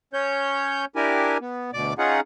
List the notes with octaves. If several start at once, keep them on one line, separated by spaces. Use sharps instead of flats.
C#4 C#5 G6
D4 E4 G4 A#4 G#5
B3
D2 B2 D5 D6
C#4 D#4 F4 G#4 F#5